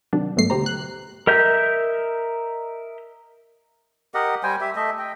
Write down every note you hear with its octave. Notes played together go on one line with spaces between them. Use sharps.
C3 D#3 F#3 D4
G#1 B2 F#3 A3 C7
D2 B2 G4 C5 A#5
F#6
A#4 D#5 E5 G6
G4 A#4 D#5 F#5
G3 C5 G5 G#5
G4 E5
A3 D#5 E5
D#5 G5